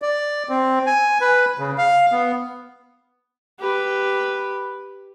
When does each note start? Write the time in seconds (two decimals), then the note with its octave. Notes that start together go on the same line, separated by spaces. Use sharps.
0.02 D5
0.49 C4
0.87 G#5
1.21 B4
1.59 C#3
1.78 F5
2.12 B3
3.59 G4 B4